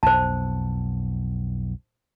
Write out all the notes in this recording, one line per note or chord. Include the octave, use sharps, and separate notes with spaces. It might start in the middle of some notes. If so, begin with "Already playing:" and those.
B1 F2 B2 C5 A5